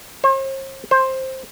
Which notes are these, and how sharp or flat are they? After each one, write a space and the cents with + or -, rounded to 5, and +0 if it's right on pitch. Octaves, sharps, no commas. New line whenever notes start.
C5 +45
C5 +10